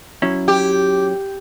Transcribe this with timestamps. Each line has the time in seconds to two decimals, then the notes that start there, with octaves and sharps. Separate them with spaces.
0.22 F#3 C#4 E4
0.48 G4